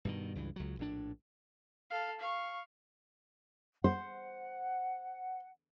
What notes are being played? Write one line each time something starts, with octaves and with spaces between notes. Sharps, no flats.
G2 B2 D#3
C#2 G2 E3
C#2 F#3
A#1 A2 D4
A4 F5
F5 C#6
C5 F#5